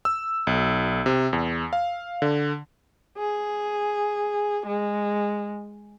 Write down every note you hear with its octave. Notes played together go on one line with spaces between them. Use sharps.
E6
B1
C3
E2
F5
D3
G#4
G#3